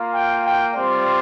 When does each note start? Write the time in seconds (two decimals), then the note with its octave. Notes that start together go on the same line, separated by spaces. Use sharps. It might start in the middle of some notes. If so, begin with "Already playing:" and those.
Already playing: A#3 F4
0.14 G5
0.45 G5
0.75 G3 C4 F4 D5